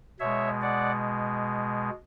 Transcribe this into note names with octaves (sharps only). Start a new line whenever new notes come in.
B2 G#3 C#5 E5
D5 F#5